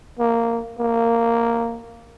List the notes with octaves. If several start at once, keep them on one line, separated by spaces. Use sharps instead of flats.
A#3
A#3